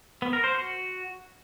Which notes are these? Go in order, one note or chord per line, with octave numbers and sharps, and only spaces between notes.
B3
A#4
C5
F#4